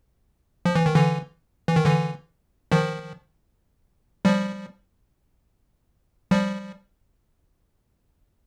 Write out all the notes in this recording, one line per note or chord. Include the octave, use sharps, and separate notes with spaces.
F3
E3
D#3
D3 E3
E3
D#3
D3 E3
D#3 F3
F3 G3
F3 G3